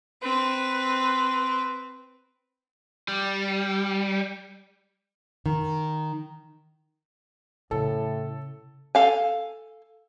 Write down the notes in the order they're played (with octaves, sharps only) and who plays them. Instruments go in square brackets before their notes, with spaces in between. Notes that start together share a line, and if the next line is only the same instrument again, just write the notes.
[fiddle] C4 B4
[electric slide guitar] G3
[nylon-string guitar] D#3
[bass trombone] A2 [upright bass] C#3 [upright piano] A4
[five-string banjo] A4 F5 G#5